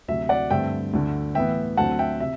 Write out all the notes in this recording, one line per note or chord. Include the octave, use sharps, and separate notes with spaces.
D2 C3 F#3 E5
D5 F#5
G2 D3 A3 C4 E5 G5
D2 D3 A3
A2 E3 B3 E5 G5
D2 D3 F#3 A3 C4 F#5 A5
E5 G5
C3 E5